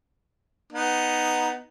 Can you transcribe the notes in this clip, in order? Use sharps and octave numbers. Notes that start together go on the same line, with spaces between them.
B3 D#4